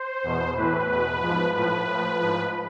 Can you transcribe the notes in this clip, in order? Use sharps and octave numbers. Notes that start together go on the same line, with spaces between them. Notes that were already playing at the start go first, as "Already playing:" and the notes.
Already playing: C5
E2 B2
A2 E3 B4
E2 B4
B2
G#2 F3
A2 F3 B4
A2 F3
G#2 F3